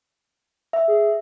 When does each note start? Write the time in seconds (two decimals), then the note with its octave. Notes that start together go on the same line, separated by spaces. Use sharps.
0.73 E5
0.88 G#4